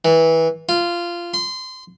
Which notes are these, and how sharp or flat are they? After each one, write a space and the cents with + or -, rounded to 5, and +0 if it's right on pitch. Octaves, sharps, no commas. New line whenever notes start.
E3 -20
F4 -15
C6 -25